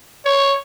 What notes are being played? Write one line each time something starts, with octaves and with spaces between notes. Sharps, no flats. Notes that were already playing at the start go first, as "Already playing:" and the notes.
C#5